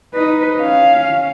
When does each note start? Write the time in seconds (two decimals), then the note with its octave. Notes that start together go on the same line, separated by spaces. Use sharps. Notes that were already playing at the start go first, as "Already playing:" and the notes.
0.14 D#4 B4
0.60 C#4 F5